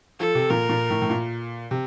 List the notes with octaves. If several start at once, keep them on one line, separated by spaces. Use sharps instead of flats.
F3 A4
C3
A#2 A#4
A#2
A2
A2
A#2
C3